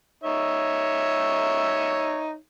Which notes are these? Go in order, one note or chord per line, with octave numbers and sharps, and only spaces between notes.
D#4 C#5 E5